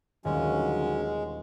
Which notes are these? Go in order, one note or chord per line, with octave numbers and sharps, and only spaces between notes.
D#1 D3 F#3 G#3 C#4